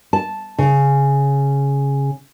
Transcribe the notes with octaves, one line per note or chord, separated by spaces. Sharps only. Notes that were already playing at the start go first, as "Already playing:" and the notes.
A5
C#3